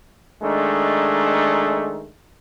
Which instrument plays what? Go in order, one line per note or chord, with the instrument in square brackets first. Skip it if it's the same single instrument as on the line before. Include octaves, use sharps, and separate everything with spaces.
[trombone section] D#3 G#3 A3 D4